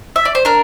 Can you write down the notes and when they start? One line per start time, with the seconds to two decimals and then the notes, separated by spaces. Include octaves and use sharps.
0.16 E5
0.25 D5
0.35 C5
0.45 D4 A#4